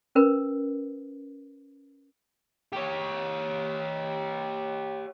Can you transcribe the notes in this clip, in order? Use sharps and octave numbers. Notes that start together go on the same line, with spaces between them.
C#4 A#4 B4
G4 C#5